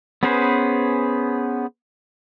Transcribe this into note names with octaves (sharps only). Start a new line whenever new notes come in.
B3 C#4 G#4 B4 C5